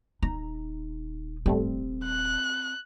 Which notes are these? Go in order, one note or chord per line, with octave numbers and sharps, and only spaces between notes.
D#1 D#4 A#5
G#1 G3 A3 C4
F#6